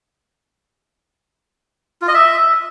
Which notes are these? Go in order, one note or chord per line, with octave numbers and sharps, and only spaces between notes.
F4
D#5
E5